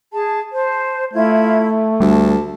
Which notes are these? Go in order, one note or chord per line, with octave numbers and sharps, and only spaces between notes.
G#4 A5
C5 A5
A3 E4 F4 G#6
D2 G3 A5